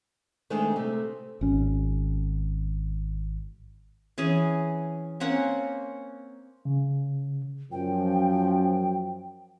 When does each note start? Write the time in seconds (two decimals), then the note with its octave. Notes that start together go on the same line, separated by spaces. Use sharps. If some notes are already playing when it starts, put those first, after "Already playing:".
0.50 D#3 G#3 A3 C4 D4 D#4
0.76 C3 A3
1.41 G#1 C#4
4.18 E3 C#4 G#4
5.20 A#3 C4 C#4 F#5
6.65 C#3
7.72 F#2 F3 G5